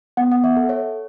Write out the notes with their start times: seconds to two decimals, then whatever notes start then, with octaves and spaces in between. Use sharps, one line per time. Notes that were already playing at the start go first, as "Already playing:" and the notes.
0.17 B3 F#5
0.32 F#5
0.44 E5
0.57 A4
0.69 C#5